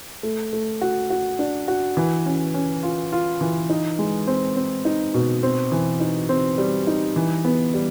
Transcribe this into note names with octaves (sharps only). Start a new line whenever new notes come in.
A3
A3
F#4
F#4
D4
F#4
E3
C#4
C#4
F4
F4
E3
D#4
G#3
C4
C4
D#4
B2
C4
E3
D#4
C4
G3
D#4
E3
B3
G3